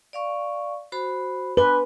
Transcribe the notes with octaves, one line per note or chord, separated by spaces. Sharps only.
D5 F5 C#6
F#4 C5 B5
D4 B4 G#5 C6